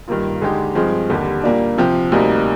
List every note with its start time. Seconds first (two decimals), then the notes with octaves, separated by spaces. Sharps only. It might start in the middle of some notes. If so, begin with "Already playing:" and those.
0.08 G2 D#3 A#3 F4
0.42 D3 G#3 D#4 G4
0.75 G2 F3 G#3 C4
1.10 D#2 D3 G3
1.44 A#2 G3 A#3 D4
1.78 C3 F3 C4 G4
2.12 D2 C3 G3 A#3 D#4